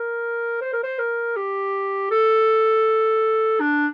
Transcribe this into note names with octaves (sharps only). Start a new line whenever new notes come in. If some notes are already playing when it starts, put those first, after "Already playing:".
Already playing: A#4
C5
A#4
C5
A#4
G4
A4
D4